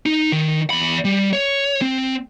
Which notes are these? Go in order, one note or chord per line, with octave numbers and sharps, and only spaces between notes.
D#4
D#3
E2 B5
G3
C#5
C4